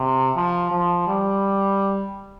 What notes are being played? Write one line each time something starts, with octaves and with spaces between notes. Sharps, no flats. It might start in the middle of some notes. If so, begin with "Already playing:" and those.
Already playing: C3
F3
F3
G3